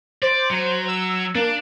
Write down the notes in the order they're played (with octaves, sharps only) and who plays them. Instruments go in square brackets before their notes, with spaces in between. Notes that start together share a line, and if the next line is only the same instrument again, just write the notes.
[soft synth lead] C5 [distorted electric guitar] D5
[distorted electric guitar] F#3
[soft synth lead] E6
[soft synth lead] A#3 [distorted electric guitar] D4